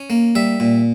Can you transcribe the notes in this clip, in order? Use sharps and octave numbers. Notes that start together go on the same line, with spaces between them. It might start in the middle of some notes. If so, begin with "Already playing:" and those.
Already playing: C#4
A#3
G3 E5
A#2